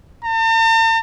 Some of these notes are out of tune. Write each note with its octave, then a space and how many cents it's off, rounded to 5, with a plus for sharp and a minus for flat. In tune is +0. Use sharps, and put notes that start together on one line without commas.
A5 +45